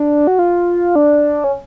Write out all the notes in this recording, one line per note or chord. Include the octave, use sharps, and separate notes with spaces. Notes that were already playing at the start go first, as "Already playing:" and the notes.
Already playing: D4
F#4
F4
D4
C#4